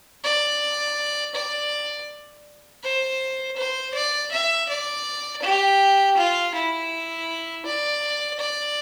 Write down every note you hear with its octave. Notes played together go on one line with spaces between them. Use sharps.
D5
D5
C5
C5
D5
E5
D5
G4
F4
E4
D5
D5